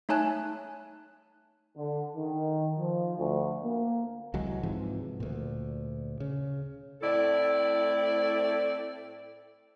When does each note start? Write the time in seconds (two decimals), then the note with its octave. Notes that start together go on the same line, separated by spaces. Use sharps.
0.09 A3 D#4 C#5 G#5 A5 F#6
1.77 D3
2.16 D#3
2.79 F3
3.18 D2
3.64 A#3
4.34 C2 E3 F#3 G#3
4.63 G#2 C3 E3 F3
5.20 D2 A#2
6.20 C#3
7.02 A2 A3 C4 E4 A4 D5